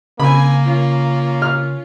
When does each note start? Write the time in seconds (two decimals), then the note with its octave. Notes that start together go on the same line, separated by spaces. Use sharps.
0.20 C#3 A#3 C4 G#5 B5
0.63 C#4 F4
1.42 F6